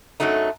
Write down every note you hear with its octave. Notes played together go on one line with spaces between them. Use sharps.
F#2 F#3 A3 D#4